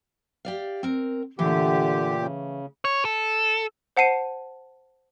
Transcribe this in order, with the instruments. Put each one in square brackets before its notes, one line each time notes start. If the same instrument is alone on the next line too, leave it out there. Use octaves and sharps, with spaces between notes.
[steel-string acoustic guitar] G4 D5 F5
C4 A#4
[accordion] A#2 G4 [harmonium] D3 [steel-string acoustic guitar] E3 A3
[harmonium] C#3
[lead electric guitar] C#5
A4
[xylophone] C5 F#5 A5 C7 D#7